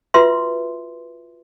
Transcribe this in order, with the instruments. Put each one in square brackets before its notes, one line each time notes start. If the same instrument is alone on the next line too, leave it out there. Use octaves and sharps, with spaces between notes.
[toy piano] F4 F#4 B4 E5 C6